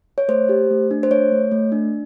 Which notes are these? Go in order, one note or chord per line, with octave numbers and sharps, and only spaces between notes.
C#5
A3 C5
G4
A3
D4
C5
A3 C#5
A3
A3
D4